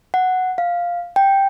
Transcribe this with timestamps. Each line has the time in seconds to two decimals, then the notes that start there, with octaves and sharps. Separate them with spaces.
0.14 F#5
0.58 F5
1.16 G5